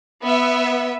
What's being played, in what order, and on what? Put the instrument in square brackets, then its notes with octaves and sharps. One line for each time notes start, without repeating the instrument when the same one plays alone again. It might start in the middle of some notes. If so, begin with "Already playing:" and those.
[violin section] B3 E5